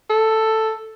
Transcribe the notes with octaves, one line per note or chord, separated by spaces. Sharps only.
A4